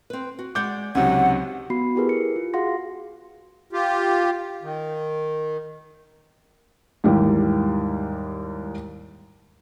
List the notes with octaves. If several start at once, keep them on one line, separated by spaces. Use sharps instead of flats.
C4 B4
F#4
G#3 D5 F#5 D6 G6
C#2 C3 F#3 C#4 D#4 G4 F#5
B3 F#4 B5 C7
E4 G4 G#4 A#4 B4
C#7
F4
F#4 G#4 F5 F#5 C6 A#6
F4 G4
D#3
D#2 G#2 E3 G3